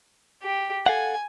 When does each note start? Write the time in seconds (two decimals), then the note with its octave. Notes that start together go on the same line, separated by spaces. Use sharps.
0.43 G4
0.86 A4 F5 F#5 G#5